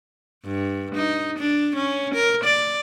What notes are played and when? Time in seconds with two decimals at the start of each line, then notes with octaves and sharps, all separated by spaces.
0.45 G2
0.95 D#4
1.39 D4
1.76 C#4
2.14 A#4
2.44 D5